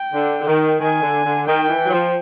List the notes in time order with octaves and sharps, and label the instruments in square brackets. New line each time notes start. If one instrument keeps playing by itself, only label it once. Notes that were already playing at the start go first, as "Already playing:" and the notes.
Already playing: [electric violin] G5
[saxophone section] D3
D3
D#3
[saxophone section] D#3 [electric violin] G#5
[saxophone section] D3
D3
[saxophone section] D#3 [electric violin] G5
[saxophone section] E3
F#3
F3